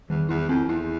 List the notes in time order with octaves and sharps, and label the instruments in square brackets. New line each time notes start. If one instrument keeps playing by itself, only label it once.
[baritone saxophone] E2 [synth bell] D#3
[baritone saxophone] E2 [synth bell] E4
[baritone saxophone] F2 [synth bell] C4
[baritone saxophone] E2 [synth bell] E4